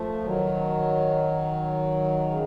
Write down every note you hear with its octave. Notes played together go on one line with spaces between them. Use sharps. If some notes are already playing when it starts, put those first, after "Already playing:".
Already playing: F3 A3
D#3 F#3
C#3